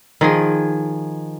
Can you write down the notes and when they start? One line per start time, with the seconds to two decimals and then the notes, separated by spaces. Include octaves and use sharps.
0.21 D#3 F3 G#4